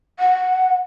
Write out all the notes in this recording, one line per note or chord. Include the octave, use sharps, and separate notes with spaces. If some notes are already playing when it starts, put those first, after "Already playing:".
F#5